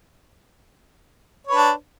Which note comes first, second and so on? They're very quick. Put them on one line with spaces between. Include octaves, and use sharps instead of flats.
C#5 B4 D4